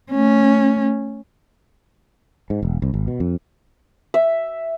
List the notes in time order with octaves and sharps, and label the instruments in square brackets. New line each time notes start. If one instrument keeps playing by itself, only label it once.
[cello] A3 C#4
[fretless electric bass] G#2
E1
C2
G#1
B2
F2
[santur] E5